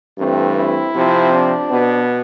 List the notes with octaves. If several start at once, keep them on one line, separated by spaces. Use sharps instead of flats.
G2 E3 A3 C4
C4 E4
C3 F3 C4
D4
B2 B3